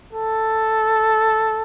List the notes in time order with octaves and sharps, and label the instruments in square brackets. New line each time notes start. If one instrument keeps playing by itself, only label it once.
[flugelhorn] A4